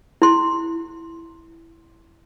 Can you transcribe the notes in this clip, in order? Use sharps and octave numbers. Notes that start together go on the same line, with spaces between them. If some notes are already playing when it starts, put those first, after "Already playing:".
E4 C6